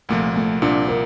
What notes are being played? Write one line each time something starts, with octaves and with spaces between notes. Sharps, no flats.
C2 A#2 F3 A3
A3
C2 A#2 F3 D4
A#4